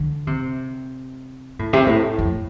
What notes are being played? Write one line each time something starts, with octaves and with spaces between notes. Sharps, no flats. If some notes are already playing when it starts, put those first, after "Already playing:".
Already playing: D3
C3
A2
C3
A2
F2